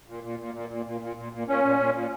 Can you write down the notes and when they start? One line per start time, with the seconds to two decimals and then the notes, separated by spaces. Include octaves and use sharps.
0.08 A#2
0.24 A#2
0.39 A#2
0.55 A#2
0.70 A#2
0.86 A#2
1.01 A#2
1.17 A#2
1.32 A#2
1.48 A#2 C#4
1.64 A#2
1.79 A#2
1.94 A#2